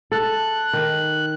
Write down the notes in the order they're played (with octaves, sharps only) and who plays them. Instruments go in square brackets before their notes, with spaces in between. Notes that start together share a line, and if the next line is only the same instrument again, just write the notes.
[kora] A4 [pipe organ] F#6
[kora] D#3